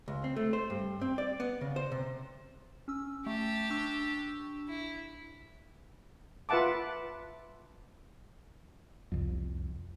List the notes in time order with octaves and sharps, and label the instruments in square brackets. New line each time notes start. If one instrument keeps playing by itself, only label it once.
[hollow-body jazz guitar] C#2
C4
A3
C5
G2
C4
D5
B3
C#3
C5
C3
[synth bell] C#4 E6
[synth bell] A3 [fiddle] G4 A5
[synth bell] D4 C#6 E6
[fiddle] E4
[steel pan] F4 B4 E5 F#5 A5 D6
[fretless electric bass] C2 F2